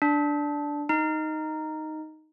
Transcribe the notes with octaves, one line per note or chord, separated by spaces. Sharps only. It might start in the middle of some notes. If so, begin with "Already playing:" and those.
D4
D#4